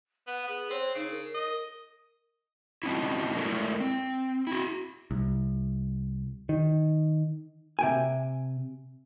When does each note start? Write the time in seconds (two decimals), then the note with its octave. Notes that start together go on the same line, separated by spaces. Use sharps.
0.27 B3 F#5
0.47 B3 G#4
0.71 C4 C#5
0.95 C#3 D#4
1.11 A#4
1.34 D#5
2.83 F#3 C4 C#4 D#4 E4
3.37 G#3 A3 E4 A4 A#4
3.80 C4
4.47 E4 F#4
5.11 C2
6.49 D#3
7.79 C3 G5 G#5